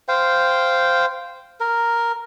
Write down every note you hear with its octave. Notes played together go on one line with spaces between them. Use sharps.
C5 F5 G5
A#4